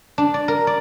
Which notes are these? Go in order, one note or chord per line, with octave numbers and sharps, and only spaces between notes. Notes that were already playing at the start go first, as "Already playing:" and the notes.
D4
D5
A#4
D5